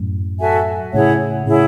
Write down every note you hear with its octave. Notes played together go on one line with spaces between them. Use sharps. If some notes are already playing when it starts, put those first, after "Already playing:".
Already playing: F#2 A2
F#4 A4 E5 G#5
A2 C#3 E4 G#4 C#5 F#5
A2 C#3 E4 G#4 C#5 F#5